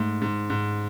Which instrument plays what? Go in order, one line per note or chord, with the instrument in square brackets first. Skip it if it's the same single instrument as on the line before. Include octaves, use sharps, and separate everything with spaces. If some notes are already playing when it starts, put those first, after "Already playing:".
Already playing: [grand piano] G#2 [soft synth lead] A3
[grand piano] G#2
G#2